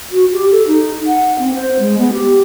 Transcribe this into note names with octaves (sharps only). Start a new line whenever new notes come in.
F#4
G4
A4
D#4
F#5
C4
C5
G#3
B3
G4